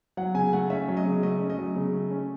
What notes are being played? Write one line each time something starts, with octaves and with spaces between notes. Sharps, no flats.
F#3 F#5
C#3 G#5
A3 F#5
C#4 E5
F#3
D#5
C#3
A3 D#5
C#4
D#5
F#3
C#3
A3
C#4